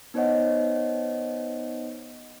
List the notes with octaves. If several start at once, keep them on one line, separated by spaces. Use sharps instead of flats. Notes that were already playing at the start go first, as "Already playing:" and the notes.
B3 D#4 C5 C#5 D#5 F#5